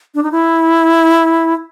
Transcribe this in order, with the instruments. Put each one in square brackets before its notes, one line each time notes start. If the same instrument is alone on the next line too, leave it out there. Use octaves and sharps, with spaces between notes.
[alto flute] D4
D#4
E4